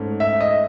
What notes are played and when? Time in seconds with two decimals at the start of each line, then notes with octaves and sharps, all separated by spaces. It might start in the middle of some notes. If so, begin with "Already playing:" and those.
Already playing: G#2 A3 C#4
0.20 E5
0.41 D#5